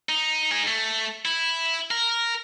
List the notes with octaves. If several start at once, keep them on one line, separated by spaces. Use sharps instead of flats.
D#4
D#4 G#4
A3
E4
A#4